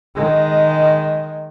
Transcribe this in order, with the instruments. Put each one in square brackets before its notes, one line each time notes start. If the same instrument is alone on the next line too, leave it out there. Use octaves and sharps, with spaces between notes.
[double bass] D#3 G#3